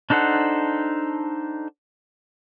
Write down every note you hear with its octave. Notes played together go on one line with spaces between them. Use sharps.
D4 D#4 A4 C5 F#5